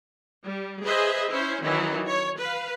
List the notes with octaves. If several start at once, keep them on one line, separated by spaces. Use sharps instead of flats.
G3
G#4 B4 C5 D#5 E5
C#4 E4 C5
D#3 E3 F#3 C#4 E4
C#5
B4 F5